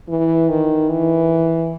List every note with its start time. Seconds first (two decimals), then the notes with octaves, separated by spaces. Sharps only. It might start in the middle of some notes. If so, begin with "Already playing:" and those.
0.09 E3
0.49 D#3
0.89 E3